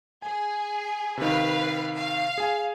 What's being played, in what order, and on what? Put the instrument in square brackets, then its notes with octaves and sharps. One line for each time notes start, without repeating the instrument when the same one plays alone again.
[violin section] G#4 [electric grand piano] G#5
[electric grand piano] C3 D#3 [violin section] B4 F5
[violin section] F5
[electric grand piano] G#4 G#5